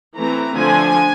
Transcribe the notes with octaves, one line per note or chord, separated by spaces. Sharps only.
E3 A3 C4 A#5
D3 F3 A3 D4 G#5